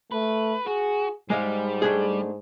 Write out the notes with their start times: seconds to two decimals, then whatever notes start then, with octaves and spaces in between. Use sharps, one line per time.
0.12 A3 B4
0.66 F#4 G#4
1.30 G#2 G3 G#3 D#5 F5
1.82 A3 D4 G#4